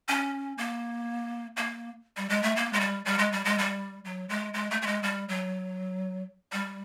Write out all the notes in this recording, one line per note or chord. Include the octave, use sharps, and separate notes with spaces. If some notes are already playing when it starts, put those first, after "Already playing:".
C#4
A#3
A#3
G3
G#3
A3
A#3
G#3
G3
G3
G#3
G3
G#3
G3
F#3
G#3
G#3
A3
A3
G#3
G3
F#3
G3